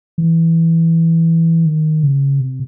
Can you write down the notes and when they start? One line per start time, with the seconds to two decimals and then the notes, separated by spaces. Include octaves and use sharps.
0.18 E3
1.66 D#3
2.03 C#3
2.40 C3